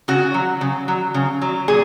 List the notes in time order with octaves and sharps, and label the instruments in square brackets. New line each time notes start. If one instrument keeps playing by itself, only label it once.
[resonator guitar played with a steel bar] C#3 F#4
F#3
C#3
F#3
C#3
F#3
A#2 G#4